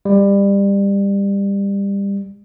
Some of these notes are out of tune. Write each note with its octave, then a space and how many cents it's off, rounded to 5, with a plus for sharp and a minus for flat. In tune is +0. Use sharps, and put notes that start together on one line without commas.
G3 +25